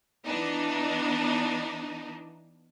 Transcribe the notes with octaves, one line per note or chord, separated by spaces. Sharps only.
E3 B3 D4 D#4